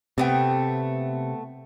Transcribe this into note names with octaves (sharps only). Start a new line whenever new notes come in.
C3 A3 B3 G5